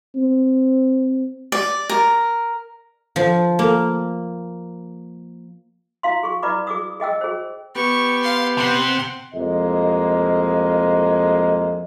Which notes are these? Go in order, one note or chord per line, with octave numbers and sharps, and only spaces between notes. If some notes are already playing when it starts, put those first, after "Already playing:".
C4
D5
A#4
F3
A#3
E4 F5 C6
G#4 C#6
E4 B4 D5 B5 D6
G#4 D6 D#6
G#4 D#5 G5 E6
G#4 C5
B3 G4 C#6
F5 C6
C3 F#5 C6
C2 F2 G#3 A#3 D#5